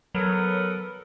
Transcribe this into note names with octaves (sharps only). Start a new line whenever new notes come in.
F#3 B3 A4 A#4